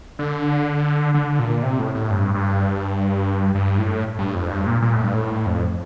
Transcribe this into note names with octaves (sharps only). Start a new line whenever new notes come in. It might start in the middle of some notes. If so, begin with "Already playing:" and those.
D3
D3
A#2
C3
A2
A2
G2
G2
G2
A2
G2
F2
G2
A#2
A#2
A2
G2
A2
F2